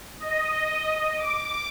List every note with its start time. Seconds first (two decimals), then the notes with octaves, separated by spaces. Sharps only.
0.20 D#5
1.17 D6